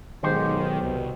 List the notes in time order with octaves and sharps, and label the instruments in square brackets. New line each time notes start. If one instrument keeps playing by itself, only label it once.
[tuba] B1 [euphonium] G#2 [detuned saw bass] D#3 [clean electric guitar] G4 C5
[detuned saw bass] C2 [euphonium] B2